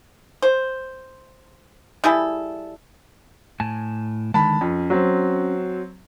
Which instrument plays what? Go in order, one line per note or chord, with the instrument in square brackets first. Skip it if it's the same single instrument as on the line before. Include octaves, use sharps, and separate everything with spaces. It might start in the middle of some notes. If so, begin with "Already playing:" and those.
[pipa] C5
G3 E4 G#4 A4
[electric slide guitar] A2 G#5 A5
[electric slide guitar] D3 D#3 G#3 [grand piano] A5 B5
[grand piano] F2 [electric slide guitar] C#4
[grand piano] F#3 C4